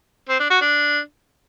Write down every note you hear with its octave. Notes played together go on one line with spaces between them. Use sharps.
C4
D4
F#4
D4